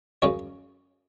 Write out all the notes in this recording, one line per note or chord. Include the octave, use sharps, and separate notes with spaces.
F#2 C#3 C#5